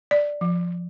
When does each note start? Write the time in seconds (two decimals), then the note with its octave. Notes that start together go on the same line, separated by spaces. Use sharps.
0.11 D5
0.41 F3